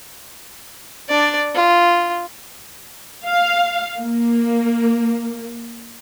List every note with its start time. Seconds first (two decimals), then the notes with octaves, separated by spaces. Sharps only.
1.09 D4 D5
1.54 F4
3.26 F5
4.01 A#3